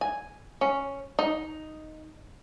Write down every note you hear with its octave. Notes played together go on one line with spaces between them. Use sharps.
G#5
C#4
D#4